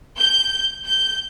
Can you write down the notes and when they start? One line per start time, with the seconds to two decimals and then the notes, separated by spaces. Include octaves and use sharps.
0.18 G6
0.85 G6